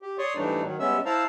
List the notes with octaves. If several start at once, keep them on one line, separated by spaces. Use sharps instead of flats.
G4
C#5 D5 C6 C#6 D#6
G#2 E3 G3 A3 D4 D#4
D#3 F#3
G3 G#3 B3 C#4 E5 E6
E4 C5 F5 A5 A#5 E6